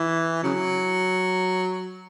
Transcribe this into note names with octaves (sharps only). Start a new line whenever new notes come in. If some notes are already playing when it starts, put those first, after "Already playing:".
Already playing: E3
C#3 F#3